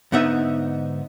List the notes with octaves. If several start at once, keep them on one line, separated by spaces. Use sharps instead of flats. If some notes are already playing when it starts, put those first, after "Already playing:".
G#2 D3 B3 D#4 E5